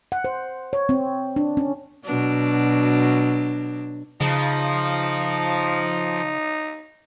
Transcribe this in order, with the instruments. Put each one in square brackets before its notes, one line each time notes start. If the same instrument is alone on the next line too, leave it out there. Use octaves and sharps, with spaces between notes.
[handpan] F#5
C5
C#5
C4
D4
C#4
[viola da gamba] B2 F#3 D4
[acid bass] C#3 [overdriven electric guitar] F3 [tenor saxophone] D#4